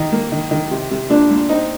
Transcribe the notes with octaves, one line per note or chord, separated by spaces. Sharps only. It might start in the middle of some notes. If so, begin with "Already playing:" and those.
Already playing: D#3 D#4
A#3
D#3
D#3
C3
C3
A#2 D4
A#2
C4 D#4